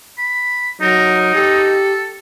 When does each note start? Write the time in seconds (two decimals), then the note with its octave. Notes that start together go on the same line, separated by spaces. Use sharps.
0.18 B5
0.82 F#3 D#4 A#4
1.34 G4 A4